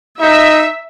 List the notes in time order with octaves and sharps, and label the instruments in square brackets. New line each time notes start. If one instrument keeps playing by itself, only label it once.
[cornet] D#4 [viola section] E5